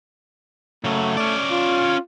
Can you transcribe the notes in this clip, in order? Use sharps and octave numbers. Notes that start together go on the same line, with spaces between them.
C#3 F#3 A3
C#4 D5
F4